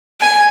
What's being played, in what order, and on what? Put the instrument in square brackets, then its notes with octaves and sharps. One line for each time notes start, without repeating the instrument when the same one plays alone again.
[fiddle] G#5